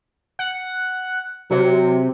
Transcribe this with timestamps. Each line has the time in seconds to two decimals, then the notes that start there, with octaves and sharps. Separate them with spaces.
0.39 F#5
1.51 C3 F#3